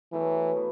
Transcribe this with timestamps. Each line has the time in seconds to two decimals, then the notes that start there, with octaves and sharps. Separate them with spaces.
0.13 B2 E3 F#3 A3
0.55 F#3 B3